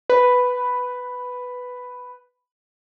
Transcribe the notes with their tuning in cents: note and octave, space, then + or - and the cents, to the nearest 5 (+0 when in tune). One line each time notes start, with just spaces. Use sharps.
B4 +5